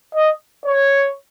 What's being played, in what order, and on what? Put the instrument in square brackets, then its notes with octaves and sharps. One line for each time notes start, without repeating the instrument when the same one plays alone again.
[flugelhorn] D#5
C#5